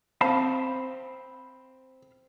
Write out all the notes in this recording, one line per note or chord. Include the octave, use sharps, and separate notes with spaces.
C4 F5 A5 B5